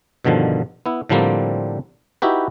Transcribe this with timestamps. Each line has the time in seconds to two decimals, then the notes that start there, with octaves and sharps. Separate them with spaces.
0.25 G2 B2 D3 D#3 F3
0.86 B3 E4
1.09 A2 D3 F3 G3 A#3 C4
2.22 D#4 E4 F#4 G4 B4